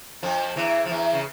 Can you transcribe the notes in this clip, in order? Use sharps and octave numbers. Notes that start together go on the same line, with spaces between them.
F2 F3
E2 E3
F3
E2 E3
C#3